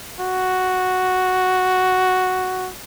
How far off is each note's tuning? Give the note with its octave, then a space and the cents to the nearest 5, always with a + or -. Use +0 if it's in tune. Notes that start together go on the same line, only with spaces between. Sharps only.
F#4 +0